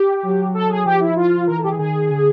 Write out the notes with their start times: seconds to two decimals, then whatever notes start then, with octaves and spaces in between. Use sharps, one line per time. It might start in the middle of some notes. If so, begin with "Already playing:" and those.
Already playing: G4
0.23 F#3
0.54 A4
0.69 G#4
0.85 F3 G4
1.00 E4
1.16 F4
1.47 E3 A#4
1.58 A4
1.64 G4
1.69 G#4
1.79 D#3 G#4
2.10 D3